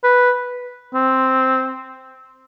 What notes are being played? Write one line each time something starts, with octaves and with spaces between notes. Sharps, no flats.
B4
C4